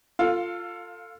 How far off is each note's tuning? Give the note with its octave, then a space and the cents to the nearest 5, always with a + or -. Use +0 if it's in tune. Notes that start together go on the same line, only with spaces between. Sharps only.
F4 +0 A4 +25 F5 +20